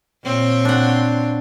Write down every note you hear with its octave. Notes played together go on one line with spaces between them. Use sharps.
A#2 C4 C#5
D4 F#5